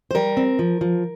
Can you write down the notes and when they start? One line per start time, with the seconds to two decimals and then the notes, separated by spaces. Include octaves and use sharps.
0.11 C5
0.15 G3 A#4
0.37 C4
0.59 F3
0.81 F3